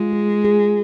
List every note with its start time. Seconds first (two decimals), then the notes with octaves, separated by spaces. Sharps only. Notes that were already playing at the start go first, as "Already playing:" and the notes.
Already playing: G#3 F4
0.13 G#4
0.45 G#4